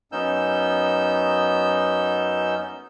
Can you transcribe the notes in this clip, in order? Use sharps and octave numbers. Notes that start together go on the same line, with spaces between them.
F#2 B3 C#4 D#4 E6 G6